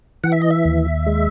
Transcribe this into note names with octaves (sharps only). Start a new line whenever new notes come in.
E3 F#5
E5
D#5
E5
D#2
G#3